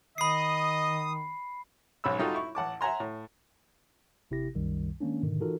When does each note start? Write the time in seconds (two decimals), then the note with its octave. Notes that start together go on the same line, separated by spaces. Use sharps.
0.18 D#3 D#5 B5 D#6 C7
2.04 B1 G#2 C#4 B5 E6
2.19 G3 D#4 F4 F#4 A4
2.34 E4 C#6
2.55 A1 F#5 A5 D6
2.81 E5 F#5 G#5 A#5 C6
3.00 A2
4.31 G#1 C3 E4 G4 A#6
4.55 C2 F#2 D#3 G3
5.01 D#3 G#3 A#3 C#4 D4
5.23 G#2 B2 D3 D#3
5.40 E3 D#4 F4 F#4 A4 A#4